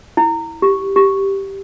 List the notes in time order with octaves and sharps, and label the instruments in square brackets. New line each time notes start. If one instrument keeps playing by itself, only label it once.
[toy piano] E4
G4
G4